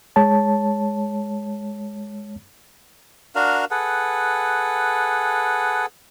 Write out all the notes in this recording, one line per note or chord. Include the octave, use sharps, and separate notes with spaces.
G#3 C#5 A5
D4 F#4 A#4 F5
G#4 A4 B4 F#5